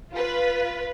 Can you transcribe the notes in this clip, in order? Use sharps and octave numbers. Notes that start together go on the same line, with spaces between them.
F4 B4